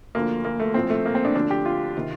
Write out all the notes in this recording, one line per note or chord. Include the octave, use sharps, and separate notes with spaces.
D2 D3 F3 A#3
A#3
A3
A#1 A2 F3 C4
A3
A#3
C4
D4
D2 D3 F3 D4
G4
F4
C3 D#3